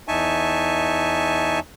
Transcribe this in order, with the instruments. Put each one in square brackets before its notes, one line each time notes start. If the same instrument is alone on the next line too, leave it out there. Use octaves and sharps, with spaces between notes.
[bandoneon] E2 D#4 E5 G#5 A5 C#6